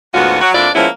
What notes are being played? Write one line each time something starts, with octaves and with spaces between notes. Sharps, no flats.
D2 G#2 B3 C#4 F4 F#4
F#3 F#4
F2 A#3 D4 E4 F4 D5
F3 G#3 A#3 B3 C#4 E4